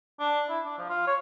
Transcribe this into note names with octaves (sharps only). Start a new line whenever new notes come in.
D4
E4
D4
F3
F4
C#5